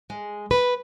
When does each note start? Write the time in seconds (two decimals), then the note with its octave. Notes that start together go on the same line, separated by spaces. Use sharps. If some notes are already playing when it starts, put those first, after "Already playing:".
0.10 G#3
0.51 B4